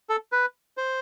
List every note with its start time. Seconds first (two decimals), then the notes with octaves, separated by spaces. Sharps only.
0.09 A4
0.32 B4
0.77 C5